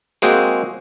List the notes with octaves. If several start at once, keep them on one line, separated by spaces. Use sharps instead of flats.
G#3 A#3 C4 F#4 G#4 G5